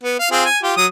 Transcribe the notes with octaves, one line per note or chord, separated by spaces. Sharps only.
B3
F5
C4 F4 G#4
G#5
F4 G4
F#3 D#6